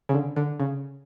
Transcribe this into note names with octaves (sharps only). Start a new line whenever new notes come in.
C#3
D3
D3
C#3